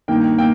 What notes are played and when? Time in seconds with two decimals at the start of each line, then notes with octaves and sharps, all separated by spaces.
0.08 G2 D#3 A#3 G5
0.38 A#3 G5